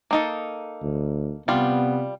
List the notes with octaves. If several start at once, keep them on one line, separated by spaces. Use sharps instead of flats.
A#3 D#4 A4
D2
C3 G3 B3 F4